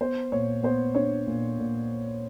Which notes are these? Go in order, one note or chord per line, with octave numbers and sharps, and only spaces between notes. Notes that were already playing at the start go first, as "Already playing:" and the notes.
B3 C5
A#2 C#5
B3 C5
D4 C#5
A#2
A#2